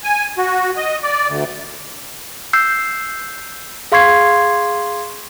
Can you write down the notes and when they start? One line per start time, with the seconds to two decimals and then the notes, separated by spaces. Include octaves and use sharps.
0.04 G#5
0.38 F#4
0.76 D#5
1.03 D5
1.28 D2
2.53 E6 G6 C7
3.92 G#4 F5 C6 C#6 G#6 C7